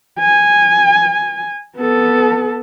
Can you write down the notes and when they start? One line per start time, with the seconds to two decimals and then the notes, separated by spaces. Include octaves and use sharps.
0.20 G#5
1.77 B3 A4